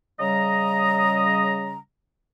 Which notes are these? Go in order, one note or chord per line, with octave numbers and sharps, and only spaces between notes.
C#3 G3 D#5 A#5